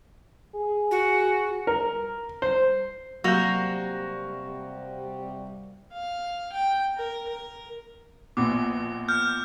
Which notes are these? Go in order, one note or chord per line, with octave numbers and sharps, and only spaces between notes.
G#4
F#4
A#4
C5
C3 F#3 G3 A#3 F#4 G6
F5
G5
A#4
A#4
A#1 B2 D6
F6 G6